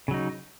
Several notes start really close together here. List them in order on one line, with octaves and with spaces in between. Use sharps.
C#3 F#3 D#4